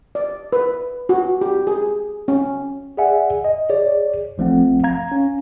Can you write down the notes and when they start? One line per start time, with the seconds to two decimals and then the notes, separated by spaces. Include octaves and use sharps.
0.15 D5
0.53 B4
1.09 F#4
1.41 G4
1.67 G#4
2.28 C#4
2.97 G#4 D5 E5 F#5 G#5
3.45 D#5
3.70 G#4 C#5 D5
4.38 G#1 F3 A3 C4 F#5
4.84 F5 A#5 G#6
5.12 C#4